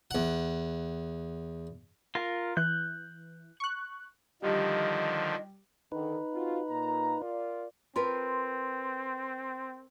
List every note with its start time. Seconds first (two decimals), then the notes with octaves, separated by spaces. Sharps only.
0.11 E2 F#5
2.15 F4 A#4
2.57 E3 F#6 G6
3.60 C#6 F#6
4.42 D3 D#3 F3 G3 D#5
5.92 D3 D#3 D#4 B4
6.33 C4 F4 F#4
6.69 A#2 A#5
7.20 F4 A#4 D5
7.96 C4 F4 A#4 B4 C6